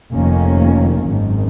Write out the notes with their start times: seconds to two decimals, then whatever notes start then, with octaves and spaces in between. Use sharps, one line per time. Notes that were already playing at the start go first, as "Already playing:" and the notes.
0.13 F1 F2 D#3 A#3 C#4
1.05 G#1 F#2 D#3